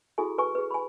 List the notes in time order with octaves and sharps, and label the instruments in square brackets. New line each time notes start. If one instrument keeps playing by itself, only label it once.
[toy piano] E4 F#4 G#4 A4 G#5
B4 G#5 C#6
G#4 B4
G#5 B5